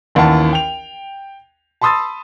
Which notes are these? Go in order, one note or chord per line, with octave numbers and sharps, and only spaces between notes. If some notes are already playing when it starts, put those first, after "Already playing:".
A1 D#2 E3 F#5 A5
G5 F7
A5 B5 C6 D#6 E6 A6